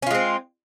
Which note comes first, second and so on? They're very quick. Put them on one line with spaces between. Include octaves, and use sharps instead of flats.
C#4 F4 G#3 C4